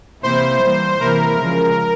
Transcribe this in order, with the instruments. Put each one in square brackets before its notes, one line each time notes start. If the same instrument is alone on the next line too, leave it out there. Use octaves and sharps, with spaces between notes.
[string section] C3 E3 A#3 E4 [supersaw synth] C5
[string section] E3 G3 A#3
[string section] C3 E3 A#3 E4 [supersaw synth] A#4
[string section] C#3 F3 G#3